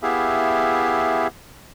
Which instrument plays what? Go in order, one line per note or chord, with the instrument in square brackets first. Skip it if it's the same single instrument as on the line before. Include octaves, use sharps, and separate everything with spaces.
[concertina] B3 E4 G4 G#4 E5 F5